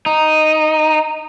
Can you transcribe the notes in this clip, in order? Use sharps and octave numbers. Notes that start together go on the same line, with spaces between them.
D#4